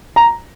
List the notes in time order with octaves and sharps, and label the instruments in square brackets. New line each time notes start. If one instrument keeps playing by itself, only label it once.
[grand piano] A#5